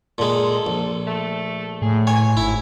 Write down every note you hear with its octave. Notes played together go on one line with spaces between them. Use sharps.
A#2 G#3 A4
A#1
A3
A2 G#4
C#5 G#5
G#1 E4